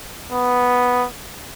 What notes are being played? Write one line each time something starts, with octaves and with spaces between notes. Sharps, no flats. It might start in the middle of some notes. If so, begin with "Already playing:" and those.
B3